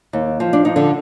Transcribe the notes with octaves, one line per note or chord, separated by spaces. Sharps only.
D#2
F3
D4
F3 D#4
D3 D4